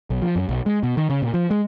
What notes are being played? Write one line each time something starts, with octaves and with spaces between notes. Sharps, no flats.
B1
F3
F#2
B1
G#3
B2
D#3
C#3
A#2
F3
G#3